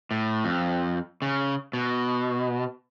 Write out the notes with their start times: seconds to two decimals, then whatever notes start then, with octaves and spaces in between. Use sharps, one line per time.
0.11 A2
0.45 F2
1.22 C#3
1.73 B2